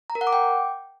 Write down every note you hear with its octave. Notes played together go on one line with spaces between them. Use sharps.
A#5
A#4
F#5
D6
G5